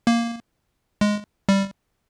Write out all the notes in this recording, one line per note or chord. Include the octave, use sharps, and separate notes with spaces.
A#3
G#3
G3